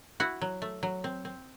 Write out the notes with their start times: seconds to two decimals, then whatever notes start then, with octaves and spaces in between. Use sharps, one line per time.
0.20 E4 F#4 F#5
0.41 F#3
0.62 A3
0.83 F#3
1.04 C4
1.25 C4